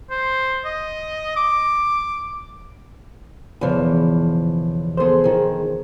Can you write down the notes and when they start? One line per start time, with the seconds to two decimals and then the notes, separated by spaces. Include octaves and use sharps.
0.11 C5
0.65 D#5
1.37 D6
3.61 B1 E2 C#3 E3 F3
4.97 B3 C4 G#4 A4 C5
5.24 D#3 F3 G#4